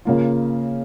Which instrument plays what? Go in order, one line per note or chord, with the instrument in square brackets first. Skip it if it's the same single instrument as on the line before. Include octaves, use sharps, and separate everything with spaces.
[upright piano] C#3 A#3 F4